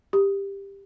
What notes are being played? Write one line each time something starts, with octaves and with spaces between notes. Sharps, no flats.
G4